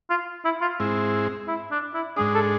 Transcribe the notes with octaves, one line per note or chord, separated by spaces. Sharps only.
F4
E4
F4
G#2 G#3 C4 E4
E4
D4
E4
G#2 G#3 D4 G#4
A4